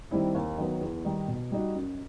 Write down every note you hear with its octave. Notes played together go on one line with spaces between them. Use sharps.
D#3 G3 C4 E4
D#2
D#3 F#3 B3
E2
D#3 G3 D#4
B2
G3 D#4 F#4
F#2